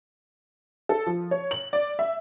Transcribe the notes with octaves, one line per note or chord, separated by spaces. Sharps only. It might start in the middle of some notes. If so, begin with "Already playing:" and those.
A4
F3
C#5
F#7
D5
E5